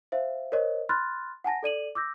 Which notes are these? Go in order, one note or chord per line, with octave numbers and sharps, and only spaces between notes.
C5 E5 F5
A#4 C5 C#5 D#5
B5 C6 F6 F#6 A6
F#5 G#5 A5 A#6
A4 D5 D#7 F#7
D6 E6 G6 A#6